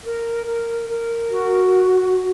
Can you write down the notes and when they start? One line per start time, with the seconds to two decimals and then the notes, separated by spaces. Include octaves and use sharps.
0.04 A#4
0.45 A#4
0.89 A#4
1.30 F#4